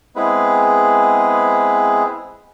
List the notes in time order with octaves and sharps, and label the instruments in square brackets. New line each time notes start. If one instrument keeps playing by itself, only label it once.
[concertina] G#3 B3 C4 E4 G#4 B4